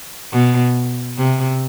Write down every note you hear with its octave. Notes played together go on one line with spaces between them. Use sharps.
B2
C3